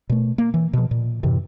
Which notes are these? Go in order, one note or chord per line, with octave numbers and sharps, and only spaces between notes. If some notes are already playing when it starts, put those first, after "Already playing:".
B2 A3
A#3
E3
B2 F3
A#2
F#2 A2 C3 E3